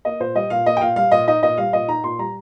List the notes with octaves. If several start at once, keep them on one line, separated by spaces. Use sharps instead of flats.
A#3 D#5
A#2 C5
G3 D#5
A#2 F5
A#3 D#5
G5
A#2 F5
G3 F5
A#2 D#5
D#4 D#5
A#2 D#5
G3 F5
A#2 D#5
D#4 A#5
A#2 C6
G3 A#5